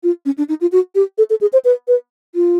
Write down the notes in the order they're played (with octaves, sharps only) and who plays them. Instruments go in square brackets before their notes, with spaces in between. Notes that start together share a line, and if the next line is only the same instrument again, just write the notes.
[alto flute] F4
C#4
D4
D#4
F4
F#4
G4
A4
A4
G#4
C5
B4
B4
F4